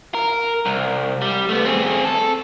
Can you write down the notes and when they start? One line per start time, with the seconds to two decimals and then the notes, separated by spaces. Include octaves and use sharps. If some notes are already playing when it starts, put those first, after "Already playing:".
0.15 A#4
0.66 C2
1.22 G3
1.49 A3 B3
1.65 C4 G#4
2.05 A4